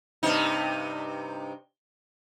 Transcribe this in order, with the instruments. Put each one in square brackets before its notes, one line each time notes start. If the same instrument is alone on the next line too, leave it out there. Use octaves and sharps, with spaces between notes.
[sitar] G2 C3 D#4